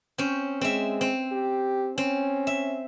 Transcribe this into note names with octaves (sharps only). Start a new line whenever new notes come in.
C4 C#4
G#3 C4 E5
C4
G4
C4 C#4
E5